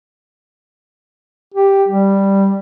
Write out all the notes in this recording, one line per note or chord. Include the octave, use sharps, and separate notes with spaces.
G4
G3